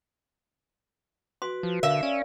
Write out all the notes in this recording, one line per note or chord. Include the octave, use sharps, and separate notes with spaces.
F#4 B4 C6
F3
D3 A#4 E5 F5
C#4 D5